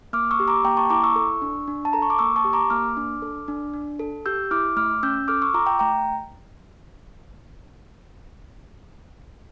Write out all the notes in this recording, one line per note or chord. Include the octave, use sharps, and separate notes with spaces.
A#3 D6 F6
C#6 E6
G4
A#5 D6
A#3 G5 A#5
A5 C#6
E4 A#5 D6
C#6 E6
A4
D4
D4
A5
A4 A#5
C#6
D6
A#3 C#6 E6
A5 C#6
G4
A#5 D6
A#3 D6 F6
D4
A4
D4
D4
A4
G4 E6 G6
E4 D6 F6
A3 D6 F6
C#4 E6 G6
A4 D6 F6
C#6 E6
F4 A#5 D6
G5 A#5
A3 G5 A#5